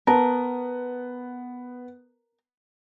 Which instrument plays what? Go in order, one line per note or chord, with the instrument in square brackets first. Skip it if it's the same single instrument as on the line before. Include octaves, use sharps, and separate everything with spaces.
[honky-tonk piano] B3 [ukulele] A#4 [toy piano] A5